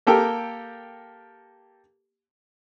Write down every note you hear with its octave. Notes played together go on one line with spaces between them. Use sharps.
A#3 G4 A4 A#4 G5